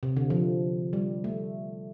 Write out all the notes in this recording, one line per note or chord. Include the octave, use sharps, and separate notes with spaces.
C3
D3
F3
G3
A3